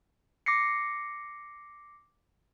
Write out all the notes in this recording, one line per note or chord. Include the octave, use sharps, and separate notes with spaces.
D6 A#6 C7 C#7